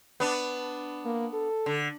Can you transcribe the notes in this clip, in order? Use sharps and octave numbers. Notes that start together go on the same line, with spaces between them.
B3 D4
A#3
A4
D3